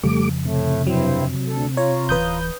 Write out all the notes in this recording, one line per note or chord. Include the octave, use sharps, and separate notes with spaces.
F2 C#3 F3 G3 A3 D6
A2 C3 A3
G2 F#3 C4 E4
D2 A4
F4 C#5 A#5
D1 E3 B4 D#6 G6